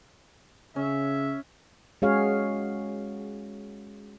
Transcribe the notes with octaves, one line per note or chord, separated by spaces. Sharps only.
C#3 C#4 E5
G#3 C#4 F#4 G#4 C#5 F5